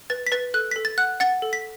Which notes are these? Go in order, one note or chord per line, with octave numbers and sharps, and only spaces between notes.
B4 A6
B6
B4 A6
A4 F#6
A4 B6
A6
F#5 F#6
F#5 A6
A4
B6